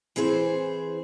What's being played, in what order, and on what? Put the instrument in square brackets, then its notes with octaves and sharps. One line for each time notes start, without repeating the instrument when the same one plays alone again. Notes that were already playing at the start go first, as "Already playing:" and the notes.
[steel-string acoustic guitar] E3 C4 G#4 C5